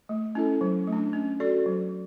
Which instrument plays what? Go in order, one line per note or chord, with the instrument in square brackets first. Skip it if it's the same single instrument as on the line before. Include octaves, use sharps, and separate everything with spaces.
[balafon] A3
C#4 E4 A4
F#3
A3
D4
C#4
F#4 A4 D5
F#3